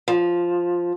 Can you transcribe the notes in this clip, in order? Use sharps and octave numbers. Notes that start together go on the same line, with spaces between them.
F3